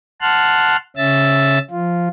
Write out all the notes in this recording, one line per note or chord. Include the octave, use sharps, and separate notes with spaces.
F#5 A5 C6 F6 F#6
C#3 C#4 E5 E6 A6
F3 F4